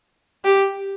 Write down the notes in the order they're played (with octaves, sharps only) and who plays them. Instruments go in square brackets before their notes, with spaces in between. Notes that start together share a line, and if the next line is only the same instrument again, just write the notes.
[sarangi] G4